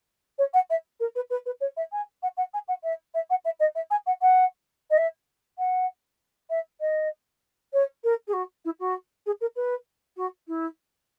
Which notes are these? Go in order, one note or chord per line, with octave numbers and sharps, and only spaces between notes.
C#5
F#5
E5
A#4
B4
B4
B4
C#5
E5
G#5
F#5
F#5
G#5
F#5
E5
E5
F#5
E5
D#5
E5
G#5
F#5
F#5
D#5
E5
F#5
E5
D#5
C#5
A#4
G#4
F#4
E4
F#4
G#4
A#4
B4
F#4
E4